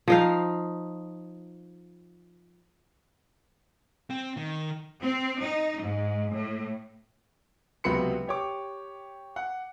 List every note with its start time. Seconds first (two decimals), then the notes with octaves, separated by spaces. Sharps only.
0.08 F3 D#4 F5
4.10 C4
4.37 D#3
5.03 C4
5.42 D#4
5.82 G#2
6.33 A2
7.84 C#2 C3 F#3 B3 B5 C#7
8.27 G4 C#5 D6
9.36 F#5